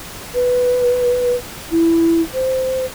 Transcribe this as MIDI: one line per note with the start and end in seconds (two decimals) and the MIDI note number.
0.34 1.36 71
1.71 2.21 64
2.33 2.85 72